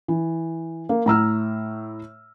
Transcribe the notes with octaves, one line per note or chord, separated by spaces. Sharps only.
E3
A#3
A2 A#5 E6 F6